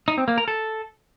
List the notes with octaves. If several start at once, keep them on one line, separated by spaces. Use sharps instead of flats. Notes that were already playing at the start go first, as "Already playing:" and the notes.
D#4
C4
A#3
A#4
A4